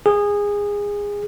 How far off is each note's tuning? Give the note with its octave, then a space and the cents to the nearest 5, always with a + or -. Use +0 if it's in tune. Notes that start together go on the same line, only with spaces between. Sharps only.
G#4 -20